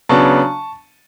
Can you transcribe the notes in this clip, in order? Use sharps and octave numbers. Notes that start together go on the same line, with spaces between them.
C#3 F#3 B3 D4 A5 C#6